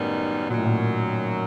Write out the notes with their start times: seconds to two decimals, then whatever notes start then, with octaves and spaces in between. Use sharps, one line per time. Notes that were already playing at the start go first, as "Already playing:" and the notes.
Already playing: F#2 A2 D#3 G3 B3 D#4
0.50 F#2 A#2 D#3 F#3
0.58 A2
0.65 A#2